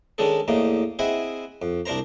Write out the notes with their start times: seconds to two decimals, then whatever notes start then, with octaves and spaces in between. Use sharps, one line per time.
0.18 D#3 G#3 C#4 D4 G#4 A4
0.48 E2 A2 A#3 D#4
0.99 C4 E4 G#4 D#5 F#5 G#5
1.62 F2
1.86 C2 D4 A#4 C5 A#5